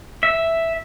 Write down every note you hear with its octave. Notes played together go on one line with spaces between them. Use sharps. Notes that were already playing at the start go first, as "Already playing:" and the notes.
E5